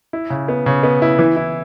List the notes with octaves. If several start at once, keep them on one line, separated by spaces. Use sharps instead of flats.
E4
C#3
B3
C#3
B3
E4
E3
E4